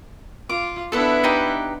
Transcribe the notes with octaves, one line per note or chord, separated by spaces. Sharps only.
F4 D6
B3 D4 E4 A4 B4 E5
D#4 G4 B4